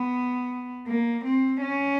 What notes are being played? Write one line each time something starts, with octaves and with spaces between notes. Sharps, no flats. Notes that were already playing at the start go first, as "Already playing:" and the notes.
Already playing: B3
A#3
C4
C#4